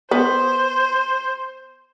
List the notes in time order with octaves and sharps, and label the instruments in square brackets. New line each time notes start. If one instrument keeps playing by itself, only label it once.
[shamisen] B3 [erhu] C5